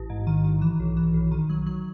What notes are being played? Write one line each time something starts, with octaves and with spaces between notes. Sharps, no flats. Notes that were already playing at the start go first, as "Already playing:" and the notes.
Already playing: A1
G#2
D#3
D#3
E3
B1
E3
B1
D#3
F#3
F#3